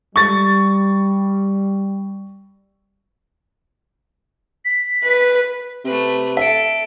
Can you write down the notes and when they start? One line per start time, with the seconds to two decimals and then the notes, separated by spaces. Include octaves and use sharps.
0.16 G3 C#6 A6
4.65 B6
5.05 B4
5.85 C3 A3 B4
6.37 A4 E5 B6 D7